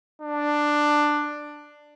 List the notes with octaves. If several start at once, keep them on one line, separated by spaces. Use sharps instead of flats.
D4